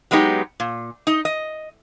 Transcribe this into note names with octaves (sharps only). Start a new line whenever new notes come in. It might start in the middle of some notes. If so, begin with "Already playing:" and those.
F#3 G#3 B3 D#4 G4
A#2
D#4 D#5
D#5